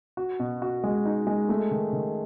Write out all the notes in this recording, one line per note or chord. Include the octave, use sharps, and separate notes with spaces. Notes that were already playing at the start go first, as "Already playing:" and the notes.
F#4
B2
F#4
G#3
D#4
G#3
A3
D#3
D#3